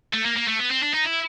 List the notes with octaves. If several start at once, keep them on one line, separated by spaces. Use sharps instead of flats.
A3
A#3
A#3
A3
B3
C4
D4
D#4
E4